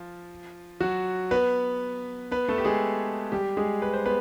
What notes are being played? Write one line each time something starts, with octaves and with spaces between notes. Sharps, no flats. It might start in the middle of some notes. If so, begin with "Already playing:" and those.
Already playing: F3 F4
F#3 F#4
B3 B4
B3 B4
A3 A4
G4
G#3 G#4
G3 G4
G#3 G#4
B4
C5
B3 B4